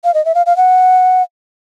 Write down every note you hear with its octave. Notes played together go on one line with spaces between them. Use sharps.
F5
D#5
E5
F5
F5
F#5